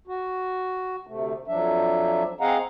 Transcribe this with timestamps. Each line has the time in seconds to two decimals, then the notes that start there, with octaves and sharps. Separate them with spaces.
0.07 F#4
1.07 D2 C3 A3
1.48 F2 F3 F#3 D4 E5
2.40 C4 G#4 D#5 F5 F#5 A#5